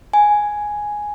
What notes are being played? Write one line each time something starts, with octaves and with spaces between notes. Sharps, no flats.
G#5